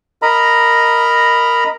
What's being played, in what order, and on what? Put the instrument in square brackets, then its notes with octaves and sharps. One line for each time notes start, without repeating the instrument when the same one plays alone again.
[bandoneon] A#4 D#5 A#5 B5